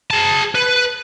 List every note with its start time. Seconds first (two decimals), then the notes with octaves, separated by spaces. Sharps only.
0.11 G#4 A5
0.55 B4